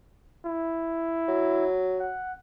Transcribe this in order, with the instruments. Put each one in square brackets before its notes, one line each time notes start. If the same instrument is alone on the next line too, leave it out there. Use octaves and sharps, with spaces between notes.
[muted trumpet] E4
[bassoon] F#3
[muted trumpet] F#5